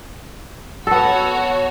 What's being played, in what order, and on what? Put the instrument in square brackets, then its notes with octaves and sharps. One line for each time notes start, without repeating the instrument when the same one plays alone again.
[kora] B3 A4 [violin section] F#4 C#5